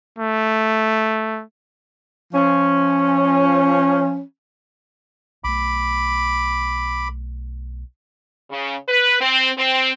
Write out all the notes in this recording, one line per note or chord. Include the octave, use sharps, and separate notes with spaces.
A3
F3 C#4
B1 A3 B5 D6
C#3
B4
C4
C4